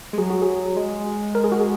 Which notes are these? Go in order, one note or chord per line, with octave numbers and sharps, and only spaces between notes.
G#3
F#3 G#4
F#4
G#4
G#3
A#4
G#4
F#4
G#4